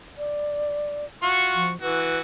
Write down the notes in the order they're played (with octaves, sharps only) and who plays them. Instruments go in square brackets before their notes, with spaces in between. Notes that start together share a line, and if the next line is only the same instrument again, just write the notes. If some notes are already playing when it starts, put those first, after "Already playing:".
[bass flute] D5
[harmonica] F4 F#4 C#6
[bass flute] F3
[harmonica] E3 F#4 [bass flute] B4